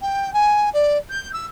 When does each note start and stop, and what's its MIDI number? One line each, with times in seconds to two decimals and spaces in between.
0.02 0.33 79
0.33 0.69 80
0.73 0.97 74
1.10 1.33 91
1.33 1.46 88